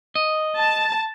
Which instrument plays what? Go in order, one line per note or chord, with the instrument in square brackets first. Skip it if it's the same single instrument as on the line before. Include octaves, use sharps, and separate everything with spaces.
[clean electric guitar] D#5
[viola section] A5